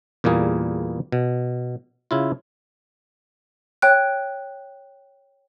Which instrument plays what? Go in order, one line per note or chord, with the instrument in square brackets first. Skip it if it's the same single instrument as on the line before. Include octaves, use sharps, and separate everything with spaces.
[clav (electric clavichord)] E2 A#2 G3 A#3 G#4
B2
C#3 E4 F4
[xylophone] C#5 G5 F#6